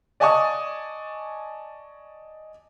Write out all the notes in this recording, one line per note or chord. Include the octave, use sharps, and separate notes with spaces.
D5 D#5 G#5 A5 C#6 D#6